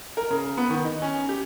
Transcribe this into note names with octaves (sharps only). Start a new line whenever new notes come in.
A#4
C#3
B3
D#3
D#4
C#4
G4